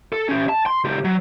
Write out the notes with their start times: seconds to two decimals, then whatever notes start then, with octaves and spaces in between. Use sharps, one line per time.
0.13 A4
0.29 C#4 G4
0.49 A5
0.66 C6
0.84 C#2 G4
1.04 F#3